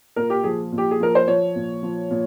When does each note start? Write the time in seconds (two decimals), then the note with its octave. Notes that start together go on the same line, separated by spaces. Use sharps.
0.16 A#2 A#4
0.30 G4
0.44 F3 G#4
0.72 A#2
0.78 G4
0.91 G#4
1.00 F3 A#4
1.15 C5
1.27 F3 C#5
1.56 A#2
1.83 F3
2.11 A#2